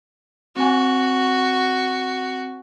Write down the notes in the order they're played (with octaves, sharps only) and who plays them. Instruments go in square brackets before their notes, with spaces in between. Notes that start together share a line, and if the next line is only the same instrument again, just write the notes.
[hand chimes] C4 G#5 [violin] F#4